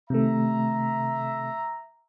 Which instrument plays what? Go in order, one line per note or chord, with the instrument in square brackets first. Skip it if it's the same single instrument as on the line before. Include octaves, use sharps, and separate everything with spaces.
[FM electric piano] C3 D#3 A3 [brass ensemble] E5 A#5